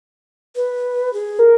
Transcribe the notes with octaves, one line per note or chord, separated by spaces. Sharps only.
B4
G#4
A#4